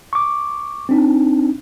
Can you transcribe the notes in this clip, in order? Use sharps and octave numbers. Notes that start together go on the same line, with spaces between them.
C#6 D6
C4 D4 D#4